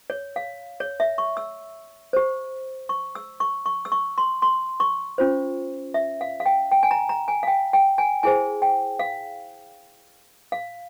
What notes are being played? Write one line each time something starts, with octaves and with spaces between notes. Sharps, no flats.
C#5
F5
C#5
E5
C#6
E6
G4 C5
C#6
E6
C#6
C#6
E6
C#6
C6
C6
C#6
C#4 F4 C5
E5
F5
F5
G5
G5
G#5
A#5
A#5
G#5
F5
G5
G5
G#5
E4 G#4 C5 G#5
G5
F5
F5